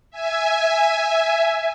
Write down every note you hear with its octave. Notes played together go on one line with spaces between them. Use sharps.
E5 G#5